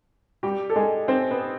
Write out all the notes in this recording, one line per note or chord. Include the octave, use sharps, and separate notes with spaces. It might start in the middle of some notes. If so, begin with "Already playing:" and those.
G3 G4
A4
G#3 G#4
C4 C5
B3 B4